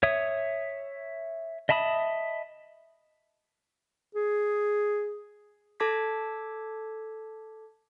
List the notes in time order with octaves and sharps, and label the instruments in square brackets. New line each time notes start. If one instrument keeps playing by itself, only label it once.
[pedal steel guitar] C#5 E5 D#6
D#5 E5 A5 B5 D#6
[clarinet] G#4
[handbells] A4 A5 D6 G#6 B6